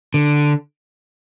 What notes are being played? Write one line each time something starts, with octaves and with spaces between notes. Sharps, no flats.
D3